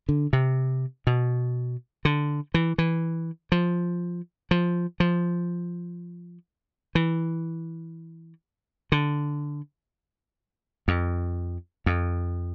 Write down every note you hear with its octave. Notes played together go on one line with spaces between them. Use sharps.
D3
C3
B2
D3
E3
E3
F3
F3
F3
E3
D3
F2
F2